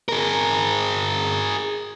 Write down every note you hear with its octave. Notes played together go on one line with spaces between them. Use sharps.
G#4 A#4